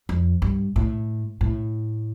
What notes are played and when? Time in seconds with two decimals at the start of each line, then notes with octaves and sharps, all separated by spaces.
0.09 F2
0.42 G2
0.76 A2
1.41 A2